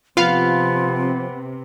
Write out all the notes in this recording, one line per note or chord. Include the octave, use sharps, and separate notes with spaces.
C3 F3 B3 F4 F5